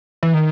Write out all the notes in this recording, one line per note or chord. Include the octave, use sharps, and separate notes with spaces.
E3
D#3